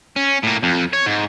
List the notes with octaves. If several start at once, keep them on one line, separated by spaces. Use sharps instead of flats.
C#4
A2 A#3
F2
C#5
G#2